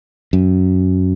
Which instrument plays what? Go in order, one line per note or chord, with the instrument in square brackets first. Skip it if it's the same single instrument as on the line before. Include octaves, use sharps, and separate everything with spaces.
[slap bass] F#2